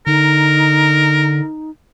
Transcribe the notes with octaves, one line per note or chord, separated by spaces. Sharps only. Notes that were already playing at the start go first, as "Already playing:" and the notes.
D3 D#4 A#4